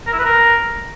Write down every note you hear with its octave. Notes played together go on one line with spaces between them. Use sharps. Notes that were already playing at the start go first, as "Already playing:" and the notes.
A#4
E4
B4
A#4